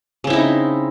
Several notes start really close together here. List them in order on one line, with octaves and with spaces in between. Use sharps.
C#3 C4 E4 D#4